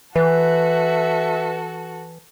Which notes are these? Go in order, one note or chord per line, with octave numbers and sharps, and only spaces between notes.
E3 F#4 A4 B4 E5